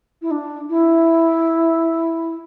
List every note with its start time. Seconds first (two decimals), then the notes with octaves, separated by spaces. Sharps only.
0.22 E4
0.31 D4
0.69 E4